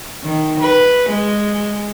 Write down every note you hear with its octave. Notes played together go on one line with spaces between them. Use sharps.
D#3
B4
G#3